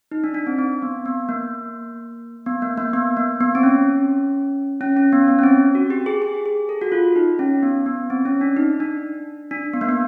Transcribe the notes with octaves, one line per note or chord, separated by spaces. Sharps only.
D#4
D4
D4
C4
C4
B3
B3
A#3
B3
A#3
A#3
B3
A#3
B3
C4
C#4
C#4
C#4
B3
B3
C#4
C4
F#4
G4
G#4
G#4
G4
G#4
A4
F#4
F4
D#4
C#4
B3
B3
C4
C#4
D4
D#4
D4
D4
B3
A#3
B3